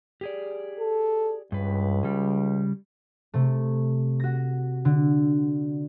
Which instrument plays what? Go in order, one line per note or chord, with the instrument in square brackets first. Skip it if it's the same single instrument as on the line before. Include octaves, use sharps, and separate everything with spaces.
[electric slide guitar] G4 G#4 D5
[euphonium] A4
[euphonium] C#2 [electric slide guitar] G2 B4
[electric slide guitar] C#3 G3
[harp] C3 A3
F#4 A#6
D3